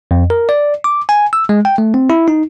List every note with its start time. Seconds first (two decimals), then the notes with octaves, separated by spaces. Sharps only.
0.11 F2
0.30 A#4
0.49 D5
0.84 D6
1.09 G#5
1.33 E6
1.49 G#3
1.65 G5
1.78 A3
1.94 C4
2.10 E4
2.28 D#4